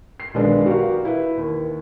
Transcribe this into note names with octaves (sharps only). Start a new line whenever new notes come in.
C7
B1 D#3 G#3 B3 D4
F#4 G4 A#4 F5
E4 B4
D#2